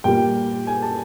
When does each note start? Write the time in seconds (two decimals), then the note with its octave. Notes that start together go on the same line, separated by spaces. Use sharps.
0.04 A#2 G3 A#3 G5
0.67 G#5
0.82 A5